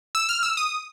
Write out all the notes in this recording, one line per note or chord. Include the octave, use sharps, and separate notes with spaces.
E6
F6
E6
D#6